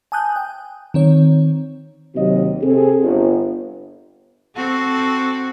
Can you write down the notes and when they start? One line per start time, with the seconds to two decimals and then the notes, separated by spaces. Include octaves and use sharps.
0.12 G#5 A5 D#6 F#6 G6
0.36 G5
0.94 D#3 C4 C#5
2.15 D#2 C3 F#3 D#5
2.62 C3 C4 G#4 A4
3.03 G1
4.55 C4 F#4 A4